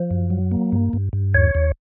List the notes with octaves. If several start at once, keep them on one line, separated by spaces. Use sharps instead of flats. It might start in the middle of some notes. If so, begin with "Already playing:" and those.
Already playing: F3
F#2
F#3
A#3
G2
G2
G2
D#2 C#5
D#2